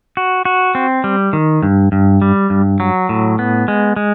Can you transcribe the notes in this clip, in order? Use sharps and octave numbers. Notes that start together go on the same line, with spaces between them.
F#4
F#4
C4
G3
D#3
G2
G2
G3
G2
F#3
A2
B3
G#3
G#3